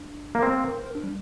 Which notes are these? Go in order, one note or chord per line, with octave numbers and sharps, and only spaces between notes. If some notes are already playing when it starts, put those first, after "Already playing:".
Already playing: D4
A#3
C4 A#4
C5
A#4
C5
A#4
D4
G3